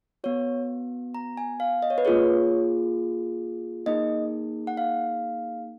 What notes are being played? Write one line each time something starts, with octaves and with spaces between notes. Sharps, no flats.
B3 F#4 C#5
A#5
G#5
F5
D#5
C#5
B4
A#3 F4 G#4 C#5
A#3 D#4 G#4 D#5
F#5
F5